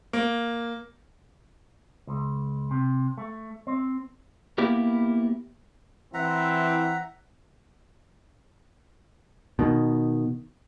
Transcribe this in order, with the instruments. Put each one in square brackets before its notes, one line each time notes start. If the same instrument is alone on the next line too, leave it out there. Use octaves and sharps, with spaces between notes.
[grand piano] A#3
[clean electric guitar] C#2
C3
A3
C4
A#3 B3 E4 G4 A#4
[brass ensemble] E3 C4 E4 [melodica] E5 F#5 A#5
[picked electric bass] B2 D#3